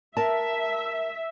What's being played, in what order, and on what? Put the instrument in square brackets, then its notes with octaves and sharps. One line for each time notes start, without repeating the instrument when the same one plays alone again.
[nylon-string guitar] A#4 A5 [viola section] E5